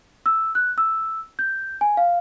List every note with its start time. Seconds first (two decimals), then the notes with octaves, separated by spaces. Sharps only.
0.26 E6
0.55 F#6
0.78 E6
1.39 G6
1.81 G#5
1.97 F5